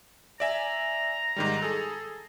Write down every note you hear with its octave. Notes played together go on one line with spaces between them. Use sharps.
D5 E5 G#5 A#5
G#2 D#3 G3
G#4 A4